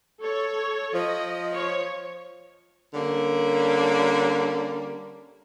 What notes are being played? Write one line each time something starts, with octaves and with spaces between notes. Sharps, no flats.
A4 C#5
F3 D#5
C#5
D3 G3 A#3 C#4